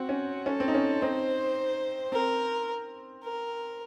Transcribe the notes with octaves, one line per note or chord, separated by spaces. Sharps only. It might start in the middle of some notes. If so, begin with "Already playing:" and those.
Already playing: C4 F#4
C#4
C#4 A4
C4
D#4
C#4
C4 D#4 C5
C4 A#4
A#4